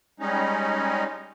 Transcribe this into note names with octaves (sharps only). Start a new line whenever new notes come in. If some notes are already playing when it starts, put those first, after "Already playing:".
G3 G#3 C#4 D#4